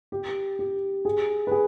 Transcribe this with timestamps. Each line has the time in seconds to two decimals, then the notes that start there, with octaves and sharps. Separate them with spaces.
0.12 G4
0.59 G4
1.05 G#4
1.47 B4
1.51 G#4